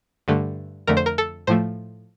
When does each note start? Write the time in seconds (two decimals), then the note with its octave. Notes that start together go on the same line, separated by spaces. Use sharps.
0.28 G2 D3 A3
0.87 F2 D3 A3 A#4
0.97 C5
1.06 A#4
1.18 A4
1.47 A2 F3 A3 C5